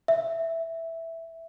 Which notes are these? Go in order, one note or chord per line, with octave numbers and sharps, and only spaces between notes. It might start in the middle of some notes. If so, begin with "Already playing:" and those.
E5